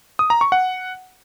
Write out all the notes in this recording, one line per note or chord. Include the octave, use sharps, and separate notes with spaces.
D#6
A#5
C#6
F#5